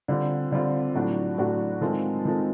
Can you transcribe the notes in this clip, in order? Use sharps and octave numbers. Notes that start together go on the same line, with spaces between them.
D3 G3 C4 F4
D3 G3 C4 F4
A2 F#3 A3 D4 F#4
A2 F#3 A3 D4 F#4
D#3 G#3 C4 F4 A4
D#3 G#3 C4 F4 A4